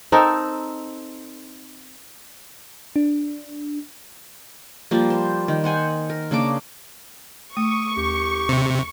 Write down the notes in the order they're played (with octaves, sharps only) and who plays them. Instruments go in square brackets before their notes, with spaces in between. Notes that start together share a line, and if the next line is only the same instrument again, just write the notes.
[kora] C4 D#4 A4 A#4
[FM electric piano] D4
[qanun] F3 G3 A#3
C5
D#3
C5 F#5 G#5
A#4
C#3 A#3 D4 D6
[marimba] A3 [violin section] C#6 [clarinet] D#6
[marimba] D#2 [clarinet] G4
[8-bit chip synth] C3